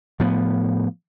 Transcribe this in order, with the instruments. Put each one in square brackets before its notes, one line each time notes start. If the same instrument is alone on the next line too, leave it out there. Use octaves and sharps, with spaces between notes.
[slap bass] A2 F3 B3